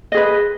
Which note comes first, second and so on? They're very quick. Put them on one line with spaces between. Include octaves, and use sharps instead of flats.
D#5 G#4 B4